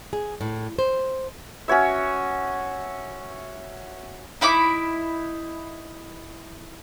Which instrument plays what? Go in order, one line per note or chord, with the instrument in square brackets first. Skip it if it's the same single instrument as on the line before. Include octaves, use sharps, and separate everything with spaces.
[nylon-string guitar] G#4
A2
C5
[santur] C#4 F#4 C#5 E5
[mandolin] D#4 E4 B5 D6